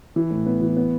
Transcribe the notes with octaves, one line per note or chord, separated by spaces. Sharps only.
E3
A2
B3
E3
B3